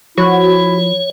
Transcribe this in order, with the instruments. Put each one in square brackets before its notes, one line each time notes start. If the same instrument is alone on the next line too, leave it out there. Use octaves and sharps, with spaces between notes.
[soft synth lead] F3 [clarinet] E4 [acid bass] F#4 [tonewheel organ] C#5